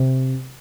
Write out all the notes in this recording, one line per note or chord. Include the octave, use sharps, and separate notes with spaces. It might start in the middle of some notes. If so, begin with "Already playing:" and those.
Already playing: C3